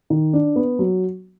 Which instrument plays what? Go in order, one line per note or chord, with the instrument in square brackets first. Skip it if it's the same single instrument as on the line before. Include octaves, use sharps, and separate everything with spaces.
[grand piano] D#3
D4
B3
F#3